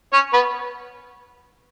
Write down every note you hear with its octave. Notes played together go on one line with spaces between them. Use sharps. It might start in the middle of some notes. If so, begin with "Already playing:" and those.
C#4 C#5
B3 B4